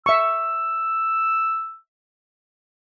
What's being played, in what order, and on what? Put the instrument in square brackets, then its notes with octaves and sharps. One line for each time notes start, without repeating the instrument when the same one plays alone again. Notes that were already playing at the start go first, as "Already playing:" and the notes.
[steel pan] E5 C#6 [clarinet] E6